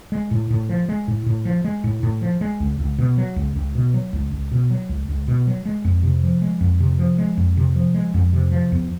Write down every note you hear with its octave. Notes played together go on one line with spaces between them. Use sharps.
G#3
A2
A2
F3
G#3
A2
A2
F3
G#3
A2
A2
F3
G#3
C#2
C#2
B2
F#3
C#2
C#2
B2
F#3
C#2
C#2
B2
F#3
C#2
C#2
B2
F#3
G#3
F2
C3
F3
G#3
F2
C3
F3
G#3
F2
C3
F3
G#3
F2
C3
F3
E2